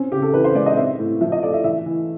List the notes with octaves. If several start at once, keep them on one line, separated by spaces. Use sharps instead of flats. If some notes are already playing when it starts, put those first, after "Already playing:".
Already playing: C4 C#4
C#3 G4
A4
E3 B4
C5
G#3 D5
D#5
C4 E5
A2
F3 E5
D#5
A3 D5
E5
E3 E5
E3